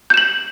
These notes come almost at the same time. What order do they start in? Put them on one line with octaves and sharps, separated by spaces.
G6 E7 F#7